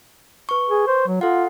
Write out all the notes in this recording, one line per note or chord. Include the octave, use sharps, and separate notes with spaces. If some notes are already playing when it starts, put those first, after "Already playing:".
B4 C#6
G#4
C5
F#3
F4 A4 F#5